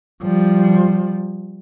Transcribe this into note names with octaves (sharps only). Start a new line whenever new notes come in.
F3 G3